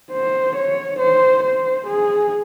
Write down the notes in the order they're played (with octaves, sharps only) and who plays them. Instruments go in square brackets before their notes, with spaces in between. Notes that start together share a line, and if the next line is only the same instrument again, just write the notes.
[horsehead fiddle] C5
C#5
C5
C5
G#4